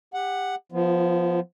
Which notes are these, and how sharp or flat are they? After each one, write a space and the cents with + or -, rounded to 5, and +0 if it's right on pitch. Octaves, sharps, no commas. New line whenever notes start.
G4 +25 F#5 +0
F3 +5 B3 +0 F4 -40